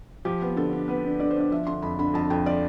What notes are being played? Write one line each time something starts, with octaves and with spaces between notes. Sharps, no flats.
F3 G4
B3
D3 A4
D4
B3 B4
D3
D3 D5
C5
D4 D5
F3 E5
D3 C6
F2 B5
D3 B5
F2 A5
F2 G5
F3 D5